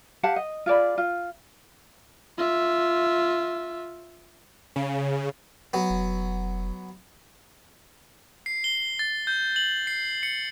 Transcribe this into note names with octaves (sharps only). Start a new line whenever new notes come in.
G4 F5 F#5 A5
D#5
F4 G#4 D5 B5
F4
F4 E5
C#3
F#3 B3
F1
C7
G7
A6
G6
F#7
C7
C#7